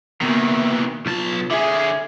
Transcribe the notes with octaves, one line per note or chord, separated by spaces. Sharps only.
B2 D#3 E3 A#3
B1 F4 A5
D3 G#4 E5